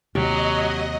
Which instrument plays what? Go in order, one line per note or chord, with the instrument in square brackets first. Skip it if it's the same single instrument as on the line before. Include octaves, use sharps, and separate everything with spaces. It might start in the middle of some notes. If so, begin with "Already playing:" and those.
[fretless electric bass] D#2 C3 [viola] F#3 [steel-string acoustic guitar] G4 [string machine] D#5